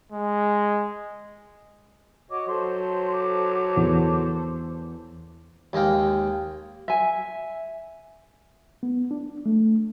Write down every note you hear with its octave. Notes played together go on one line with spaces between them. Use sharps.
G#3
F#4 C#5 D#5 D6
F#3 A4 C5 C6
D6
E2
D#2 G#3 D#5 F5 G5
E5 G#5
B3
D4
A3